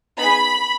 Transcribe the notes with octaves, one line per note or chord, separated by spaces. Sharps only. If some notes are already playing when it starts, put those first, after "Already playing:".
B3 D#4 G#4 B5